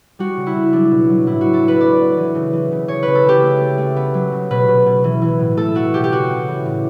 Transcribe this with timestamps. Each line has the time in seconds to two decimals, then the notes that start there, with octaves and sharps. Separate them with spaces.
0.19 G3 F#4
0.37 C#3
0.47 E4
0.56 C#3
0.73 F#3 D4
0.91 B2
1.09 F#3
1.27 A2 E4
1.41 F#3 F#4
1.54 A4
1.64 F#3 B4
1.81 B3 D5
1.99 B3
2.17 E3
2.35 C#3
2.53 E3
2.71 C#3
2.88 C#3 C#5
3.03 C#3 B4
3.15 A4
3.25 C#3 G4
3.42 A3
3.60 A3
3.78 A3
3.96 B3
4.14 F#3
4.32 C#3
4.50 B2 B4
4.68 B2
4.86 B2
5.04 E3
5.22 E3
5.39 A2
5.57 A3 A4
5.75 A3 F#4
5.93 B2 G4
6.04 G4
6.12 C#3 F#4
6.29 C#3
6.48 E3
6.66 A2